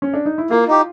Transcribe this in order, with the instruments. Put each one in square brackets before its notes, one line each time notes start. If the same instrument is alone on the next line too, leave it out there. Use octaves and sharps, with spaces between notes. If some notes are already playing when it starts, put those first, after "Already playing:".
[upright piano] C#4
D4
D#4
E4
[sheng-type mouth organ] A#3 [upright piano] F4
[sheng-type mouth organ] D#4 G4